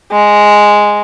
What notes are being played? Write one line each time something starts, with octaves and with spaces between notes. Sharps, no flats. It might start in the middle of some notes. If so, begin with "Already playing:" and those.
G#3